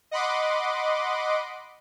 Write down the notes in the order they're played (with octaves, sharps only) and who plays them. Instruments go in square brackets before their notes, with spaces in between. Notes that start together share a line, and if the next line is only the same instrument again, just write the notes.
[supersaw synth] D#5 F#5 B5 C6 D6